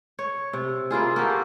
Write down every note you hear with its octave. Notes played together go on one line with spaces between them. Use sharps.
C#5
C3
A#3 E4 F4 G#4
A#3 F#4 G4 A4